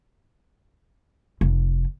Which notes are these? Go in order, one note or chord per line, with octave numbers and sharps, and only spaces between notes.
F1